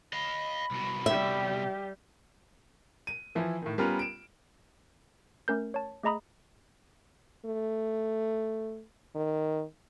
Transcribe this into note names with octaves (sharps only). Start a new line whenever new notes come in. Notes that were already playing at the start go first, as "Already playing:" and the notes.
D#5 F5 B5
C2 B2
G3 G4 E5
D#7
E3 F3 E4
A2 D#3
G3 B3 C#4 F4 A#4
D7 E7
A3 C#4 A#4 G6
C#5 A5
A3 G#4 D#5 A#5 B5 D#6
A3
D#3